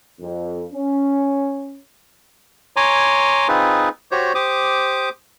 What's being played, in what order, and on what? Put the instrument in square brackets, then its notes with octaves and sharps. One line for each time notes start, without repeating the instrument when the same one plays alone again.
[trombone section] F2
C#4
[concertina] C#5 G#5 A#5 C6 D6
C4 D#4 F4 G#4 B4
F#4 G4 C5 C#5
G4 C5 D6 D#6